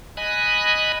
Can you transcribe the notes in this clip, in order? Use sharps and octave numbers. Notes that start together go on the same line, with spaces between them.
D#5 G#5 B5 F#6